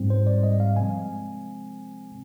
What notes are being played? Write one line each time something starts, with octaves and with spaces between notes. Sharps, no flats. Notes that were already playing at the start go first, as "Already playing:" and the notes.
Already playing: G#2 G3 C4
C5
D5
D#5
F5
C3 F3 G#3 C4 G#5